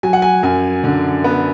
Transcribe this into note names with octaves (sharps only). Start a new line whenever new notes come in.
F#3 G#5
F#5
G#5
F#2 G#5
D3
B3